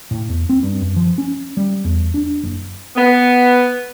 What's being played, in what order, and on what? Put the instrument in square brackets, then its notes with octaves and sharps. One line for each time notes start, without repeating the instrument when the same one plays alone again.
[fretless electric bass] A2
E2
C4
G2
F#2
F3
C#4
G3
E2
D4
F#1
[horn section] B3